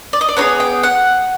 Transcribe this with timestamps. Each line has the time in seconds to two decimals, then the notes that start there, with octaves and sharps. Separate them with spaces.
0.13 D5
0.21 D#5
0.29 D5
0.37 B3 D#4 G#4 C#5
0.60 G5
0.83 F#5